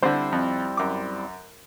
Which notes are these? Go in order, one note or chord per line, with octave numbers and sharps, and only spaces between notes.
D3 G3 C4 E4 C5
F2
F#2 D6